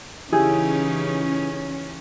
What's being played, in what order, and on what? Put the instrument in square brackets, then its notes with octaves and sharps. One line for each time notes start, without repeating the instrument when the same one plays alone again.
[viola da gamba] C#3 E3 D#4 [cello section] C#4 [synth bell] E4 G4 [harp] G#4